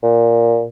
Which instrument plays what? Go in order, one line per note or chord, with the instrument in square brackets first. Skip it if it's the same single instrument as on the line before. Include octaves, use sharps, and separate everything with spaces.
[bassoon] A#2